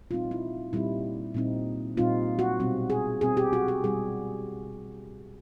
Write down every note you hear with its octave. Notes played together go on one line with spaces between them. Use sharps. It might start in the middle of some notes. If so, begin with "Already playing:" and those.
A#2 G3 C4 D#4 F4
E4
A#2 G3 C4 D#4 E4
A#2 G3 C4 D#4
A#2 G3 C4 D#4 F4
F#4
B2 G3 C4
G#4
B2 G3 C4 G#4
G4
F#4
G4
B2 G3 C4 G#4